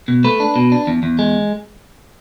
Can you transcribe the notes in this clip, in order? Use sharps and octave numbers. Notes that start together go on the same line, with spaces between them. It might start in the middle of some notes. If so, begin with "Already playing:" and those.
B2
A3 B4
D4
B2
D4
E2
E2
G#3